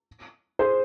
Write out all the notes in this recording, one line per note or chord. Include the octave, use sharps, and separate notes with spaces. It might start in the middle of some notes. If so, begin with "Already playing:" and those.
G#4 C5